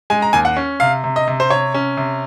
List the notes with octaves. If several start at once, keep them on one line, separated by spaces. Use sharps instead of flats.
G#3 G#5
A#5
D#2 G#5
F#5
C#4
C3 F5
C3
D#5
C3
C5
C3 C#5
C#4
C3